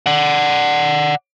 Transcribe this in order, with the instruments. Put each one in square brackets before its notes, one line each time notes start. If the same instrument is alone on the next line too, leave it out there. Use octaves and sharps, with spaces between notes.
[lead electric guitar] D5 F#5